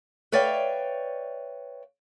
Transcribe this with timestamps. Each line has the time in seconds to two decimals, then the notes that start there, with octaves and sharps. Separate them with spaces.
0.32 B4 C#5 D5 E5 F5 G5